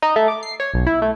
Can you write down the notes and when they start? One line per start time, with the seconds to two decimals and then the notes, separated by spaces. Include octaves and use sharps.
0.02 D#4
0.16 A3
0.28 D6
0.43 C7
0.60 C#5
0.74 B1
0.87 E4
1.02 A3